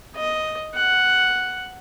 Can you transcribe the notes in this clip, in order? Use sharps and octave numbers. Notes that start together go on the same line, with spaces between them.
D#5
F#5